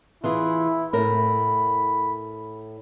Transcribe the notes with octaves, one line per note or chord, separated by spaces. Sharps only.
E3 E4 F4 G#4
A2 A#4 B5